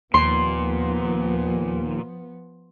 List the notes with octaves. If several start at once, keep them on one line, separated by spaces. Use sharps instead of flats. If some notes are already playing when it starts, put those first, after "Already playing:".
D#2 A#2 F3 B3 C6